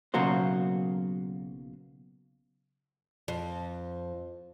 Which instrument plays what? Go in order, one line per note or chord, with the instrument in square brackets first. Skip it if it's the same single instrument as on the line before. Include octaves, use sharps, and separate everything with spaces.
[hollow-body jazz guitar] B1 C#3 F#3 A#3 F#4 C5
[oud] F2